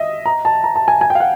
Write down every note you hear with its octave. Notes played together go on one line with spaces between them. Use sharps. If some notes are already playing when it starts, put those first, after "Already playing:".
Already playing: D#5 E5
A#5
A5
A#5
A5
G#5
G#5
G5
F5
F#5